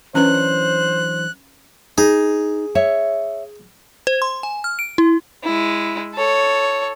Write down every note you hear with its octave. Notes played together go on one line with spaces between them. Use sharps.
E3 F#3 C#4 D4 B4 C5 F#6
D#4 G#4
C#5 E5
C5
C6
G#5
F6
D7
E4
G#3 E4
A4 C#5